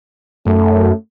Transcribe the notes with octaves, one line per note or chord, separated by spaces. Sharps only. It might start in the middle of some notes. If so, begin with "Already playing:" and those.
F#2 A3